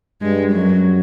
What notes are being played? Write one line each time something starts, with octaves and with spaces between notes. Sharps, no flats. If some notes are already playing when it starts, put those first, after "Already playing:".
G2 G#3
F#2 F#3